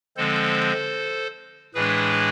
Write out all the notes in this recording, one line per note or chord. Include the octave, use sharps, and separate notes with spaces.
D3 F3 G#3 C4 A4 C5
A2 E3 G#3 D4 G#4 B4